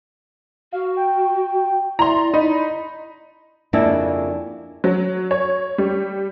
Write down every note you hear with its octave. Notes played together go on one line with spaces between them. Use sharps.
F#4 F5
G5
E4 D5 A#5 C6
D#4 B5
F2 C#3 A#3 D4 E4
F#3
C#5
G3